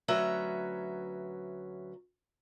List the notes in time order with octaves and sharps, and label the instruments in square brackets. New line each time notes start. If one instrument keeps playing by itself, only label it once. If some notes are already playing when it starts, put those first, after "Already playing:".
[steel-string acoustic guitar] D2 F#3 C#4 B4 E5 A#5